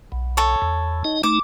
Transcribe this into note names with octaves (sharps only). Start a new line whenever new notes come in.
B1
A4 C#5
E2
D#4 D#5
A3 D#4 D6